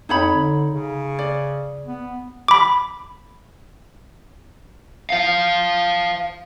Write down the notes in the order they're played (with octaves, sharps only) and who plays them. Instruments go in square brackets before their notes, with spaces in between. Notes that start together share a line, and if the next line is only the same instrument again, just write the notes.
[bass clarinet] F2 [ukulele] D#4 C#5 B5
[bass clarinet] D3
C#3
[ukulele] D5
[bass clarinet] B3
[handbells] B5 D6
[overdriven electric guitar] C5 F5